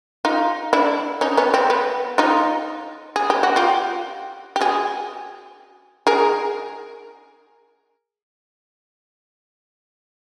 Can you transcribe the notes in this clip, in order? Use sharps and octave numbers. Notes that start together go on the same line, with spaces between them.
D#4 F4
D4 E4
C#4 D#4
B3 C#4
C4
B3
D#4 F4
G#4
G4
F#4
F4 G4
G4
F#4 G#4
G#4 A#4